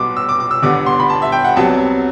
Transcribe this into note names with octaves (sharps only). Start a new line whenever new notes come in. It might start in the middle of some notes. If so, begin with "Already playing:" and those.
Already playing: B1 B2 G3 B3 C6 D6
E6
D6
D6
E6
G1 G2 D3 G3 B3 D6
C6
B5
A5
E5
G5
F#5
C2 C3 F#3 B3 A5